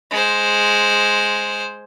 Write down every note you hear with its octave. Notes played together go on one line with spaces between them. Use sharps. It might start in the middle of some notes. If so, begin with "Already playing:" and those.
G#3 C5